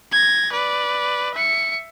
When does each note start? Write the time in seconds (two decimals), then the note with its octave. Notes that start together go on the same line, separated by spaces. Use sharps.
0.12 G#6 A#6
0.52 B4 D5
1.34 E5 C#7